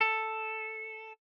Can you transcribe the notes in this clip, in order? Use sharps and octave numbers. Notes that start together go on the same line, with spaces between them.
A4